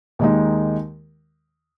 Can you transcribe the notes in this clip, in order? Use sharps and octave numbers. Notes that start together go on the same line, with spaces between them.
D#2 D#3 G#3 D#4